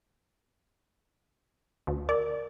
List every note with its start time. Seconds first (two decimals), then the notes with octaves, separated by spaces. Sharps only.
1.87 D2
2.09 A#4 D5